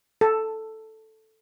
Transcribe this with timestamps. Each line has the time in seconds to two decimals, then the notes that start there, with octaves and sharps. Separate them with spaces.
0.21 A4